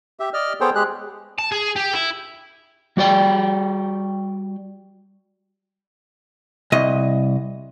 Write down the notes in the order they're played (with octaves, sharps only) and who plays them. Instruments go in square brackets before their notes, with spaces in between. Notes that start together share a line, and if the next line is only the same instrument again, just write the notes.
[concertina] G4 E5
D5 D#5 F6
B3 G#4 A4 C5 C#5 G5
G#3 G4 G#4 F#6
[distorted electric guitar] A5
G#4
G4
E4
[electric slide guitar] G3 F#4 D5 G5
[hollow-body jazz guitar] C2 D#5